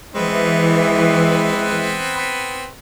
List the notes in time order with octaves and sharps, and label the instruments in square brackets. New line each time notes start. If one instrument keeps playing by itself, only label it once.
[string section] E3 [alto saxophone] G#3 [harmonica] B3 C4 B4